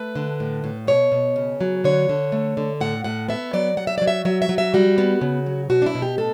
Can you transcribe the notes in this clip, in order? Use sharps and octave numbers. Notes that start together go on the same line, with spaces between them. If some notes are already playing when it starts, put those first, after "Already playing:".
Already playing: A3 B4
D3
A2
A2
B2 C#5
B2
C#3
F#3
D3 C#5
D3
A3
D3
A2 F#5
A2 F#5
B3 E5
F#3 D5
F#3 F#5
E5
F#3 D5
E5
F#3 E5
E5
F#3
E5
G3 F#4
B3
C#3
F#3
B2 F#4
D4
E4
B2
G4
A2 A4